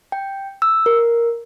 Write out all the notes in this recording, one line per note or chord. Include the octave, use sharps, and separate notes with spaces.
G5
E6
A#4